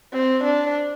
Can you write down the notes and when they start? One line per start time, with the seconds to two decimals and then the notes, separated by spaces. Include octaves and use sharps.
0.13 C4
0.44 D4